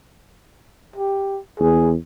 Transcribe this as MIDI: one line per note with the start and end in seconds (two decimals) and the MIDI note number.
0.96 1.40 67
1.60 1.95 40
1.60 1.91 68